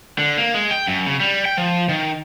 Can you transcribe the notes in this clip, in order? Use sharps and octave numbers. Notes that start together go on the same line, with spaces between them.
D3
A#3
G#3
G5
F#2
C#3
G3
G5
F3
D#3